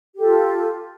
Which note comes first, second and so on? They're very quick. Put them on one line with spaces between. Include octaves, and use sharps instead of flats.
G4 A4 F4